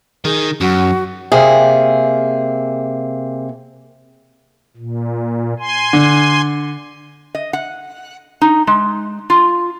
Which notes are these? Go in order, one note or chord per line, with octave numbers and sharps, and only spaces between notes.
D#3 G#4
F#2 F#4
C3 A#3 G#4
A#2
G#5 C6
D3
D#5
F#5
D#4
G#3
F4